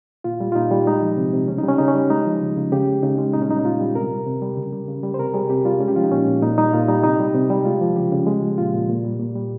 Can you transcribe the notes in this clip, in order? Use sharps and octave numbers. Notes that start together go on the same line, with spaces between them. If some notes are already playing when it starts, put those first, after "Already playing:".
A#2 F4
G3
F4
A#2 D#4
G3
G#3 D#4
F3
C3
C3
C#3 C#4
G3 D#4
C#4
C#3 D#4
C#4
G3
G#3 D#4
F3
C#3
C#3
C#3 G4
G#3
C#3 D#4
G#3 C#4
A#2 D#4
C#4
G3 D#4
D#4
A#2 F4
G3
C3 A#4
G3
C3
G3
C#3
G3
C#3
G3
C5
C3 A#4
G3 G#4
C3 G4
G3 F4
G#3 C#4
G4
F3 F4
D#4
A#2 C#4
A#2
A#2 D#4
G3 D#4
A#2 F4
G3 D#4
C3 D#4
G3
C3
G3
G#3 F4
F3
C#3 G4
C#3
G#3
F3
A#2 F4
A#2
A#2
G3
A#2
G3